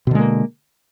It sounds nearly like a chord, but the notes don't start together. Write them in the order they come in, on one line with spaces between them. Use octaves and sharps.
B2 D3 G#3 A#3